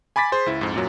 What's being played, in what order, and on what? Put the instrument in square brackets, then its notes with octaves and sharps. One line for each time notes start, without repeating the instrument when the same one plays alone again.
[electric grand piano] G#5 B5 D6 A6 B6
G#4 C5 C6
C#2 E4
F2 G#2
F#2 A#2 F#3